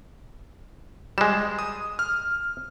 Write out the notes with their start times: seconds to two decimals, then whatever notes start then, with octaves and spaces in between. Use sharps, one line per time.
1.18 G3 G#3 E7
1.59 D#6
1.99 F6